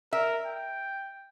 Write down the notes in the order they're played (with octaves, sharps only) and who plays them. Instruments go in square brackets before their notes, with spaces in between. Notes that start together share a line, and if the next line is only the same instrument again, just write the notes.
[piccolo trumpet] A#4 [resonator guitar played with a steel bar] E5
[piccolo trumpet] G5